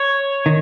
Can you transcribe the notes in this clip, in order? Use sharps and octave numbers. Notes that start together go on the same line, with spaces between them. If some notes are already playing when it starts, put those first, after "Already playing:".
Already playing: C#5
D#3